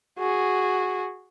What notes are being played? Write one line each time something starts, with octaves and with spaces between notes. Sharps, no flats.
F#4 G#4